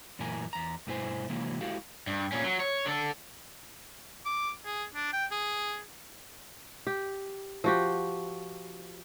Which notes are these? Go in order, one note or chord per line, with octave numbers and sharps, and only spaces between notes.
F#2 A#2 E3 A3 A#4 G#5
E2 A#5
G2 B2 A3 E4 C5 G#5
C3 E3 F#3 G#3 A#3
G#3 E4 F#4 G4 A4 F5
G2
A#2 C#4
F#3
C#5
D3 A4
D6
G#4
D4
G5
G#4
G4
F3 F#4 G4